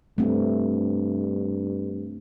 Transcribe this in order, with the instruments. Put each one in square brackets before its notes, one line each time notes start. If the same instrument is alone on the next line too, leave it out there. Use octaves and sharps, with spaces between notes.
[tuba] G2 [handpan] A3 C4